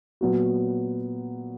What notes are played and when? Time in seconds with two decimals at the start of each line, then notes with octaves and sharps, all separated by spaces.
0.21 A#2 F#3 B3 F#4